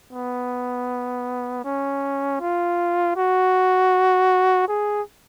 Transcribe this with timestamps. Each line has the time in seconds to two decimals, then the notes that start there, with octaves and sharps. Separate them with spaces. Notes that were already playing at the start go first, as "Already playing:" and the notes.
0.13 B3
1.64 C#4
2.40 F4
3.16 F#4
4.68 G#4